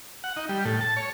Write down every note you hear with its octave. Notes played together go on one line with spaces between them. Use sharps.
F#5
D#4
G3
A2
A5
C#5